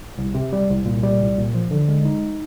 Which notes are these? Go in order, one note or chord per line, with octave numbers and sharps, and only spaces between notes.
C2
C3
G3
C2
A#2
G3
C2
A#2
F3
D3
G#3
D#4